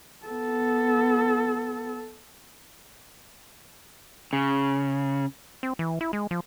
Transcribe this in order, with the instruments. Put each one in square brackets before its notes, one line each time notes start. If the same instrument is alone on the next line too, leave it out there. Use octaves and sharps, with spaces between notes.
[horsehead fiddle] B3 A4
[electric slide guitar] C#3
[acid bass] C4
E3
E4
G#3
F3